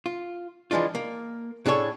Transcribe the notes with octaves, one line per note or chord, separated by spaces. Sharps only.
F4
E3 F3 G#3 D4 F4
A#3
A2 D4 G#4 A4 C#5